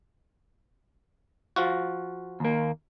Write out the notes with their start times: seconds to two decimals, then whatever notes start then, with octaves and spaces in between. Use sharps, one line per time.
1.56 F3 F4 F#4
2.40 D#2 A#3